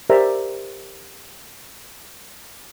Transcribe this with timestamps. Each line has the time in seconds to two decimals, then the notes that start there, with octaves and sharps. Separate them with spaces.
0.10 G4 A#4 C5 D5 E5 A#5